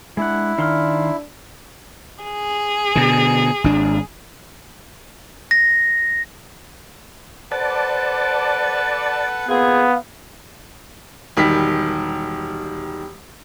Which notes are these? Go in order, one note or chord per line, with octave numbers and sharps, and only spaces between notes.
G#3 D4 E4 F#5
D#3 D4 F5 C6 F6
G#4
B2 D3
G#1 D4
A#6
A4 B4 C5 D5 F#5 A5
A#2 B3 C4 G#4 F5
E1 D#3 G3 B6